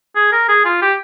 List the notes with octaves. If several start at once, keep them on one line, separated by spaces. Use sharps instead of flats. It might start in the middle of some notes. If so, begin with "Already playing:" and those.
G#4
A#4
G#4
F4
G4